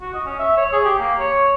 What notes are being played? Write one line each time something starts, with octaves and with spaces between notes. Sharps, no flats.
F#4
D#5
C#4
E5
C#5
G#4
G4
A#3
C#5